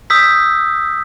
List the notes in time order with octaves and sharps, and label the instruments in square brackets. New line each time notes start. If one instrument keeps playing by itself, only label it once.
[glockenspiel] D#6 E6 G6 B6